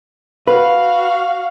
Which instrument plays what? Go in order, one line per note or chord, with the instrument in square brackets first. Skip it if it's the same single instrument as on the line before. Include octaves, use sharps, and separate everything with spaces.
[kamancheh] F#4 F5 [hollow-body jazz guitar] B4